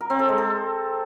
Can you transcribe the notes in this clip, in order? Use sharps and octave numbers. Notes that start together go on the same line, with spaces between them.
A#4
C4
A4
G#3
A4